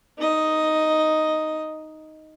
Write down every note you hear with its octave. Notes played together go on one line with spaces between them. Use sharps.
D#4 D#5